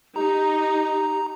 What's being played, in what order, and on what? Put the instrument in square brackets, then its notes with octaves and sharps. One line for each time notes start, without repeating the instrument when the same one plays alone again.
[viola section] D#4 [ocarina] G4 [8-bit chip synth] A#5